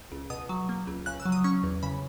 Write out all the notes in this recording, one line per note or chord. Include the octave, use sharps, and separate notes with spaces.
C#2
B2 D#6
F#3
A#3
C#2
C#3 F#6
E6
F#3
D#6
C#4 C#6
E2
C#3 B5